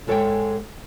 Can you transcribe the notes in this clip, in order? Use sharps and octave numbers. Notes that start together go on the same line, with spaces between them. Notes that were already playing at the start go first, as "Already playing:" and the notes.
G#2 G#3 A4 C#5 E5 G5